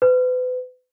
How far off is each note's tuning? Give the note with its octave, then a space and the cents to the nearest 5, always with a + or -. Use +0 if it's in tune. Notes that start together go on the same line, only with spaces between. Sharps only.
B4 +35